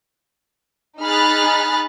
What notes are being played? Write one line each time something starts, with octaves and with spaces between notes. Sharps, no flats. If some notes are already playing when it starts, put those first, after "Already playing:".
D#4 G#4 B5 F6 F#6 A6